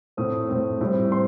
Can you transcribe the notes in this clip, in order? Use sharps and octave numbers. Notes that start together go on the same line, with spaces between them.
A2 A3 C4 D#6
A2 A3 C4
A2 G3 C4
C4 C6